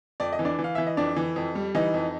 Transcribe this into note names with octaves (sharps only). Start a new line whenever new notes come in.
F2 D5
D#5
E3
D4 D5
E3
F5
E3 E5
D#5
F2 D4 D5
E3
F2
G3
E3 D#4 D#5
F2